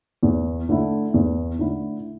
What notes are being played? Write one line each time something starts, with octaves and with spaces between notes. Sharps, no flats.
E2
D3 A3 E4
E2
D3 A3 E4